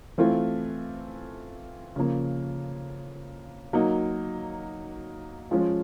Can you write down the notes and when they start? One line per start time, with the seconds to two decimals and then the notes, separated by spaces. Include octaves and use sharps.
0.18 E3 A3 C4 F4
1.96 C#3 F3 A#3
3.73 F#3 A#3 D#4
5.51 F3 G#3 C#4 F4